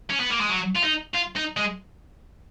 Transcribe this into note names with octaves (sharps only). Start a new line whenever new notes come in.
C#4
B3
A#3
G#3
F#3
F4
D#4
F4
D#4
G#3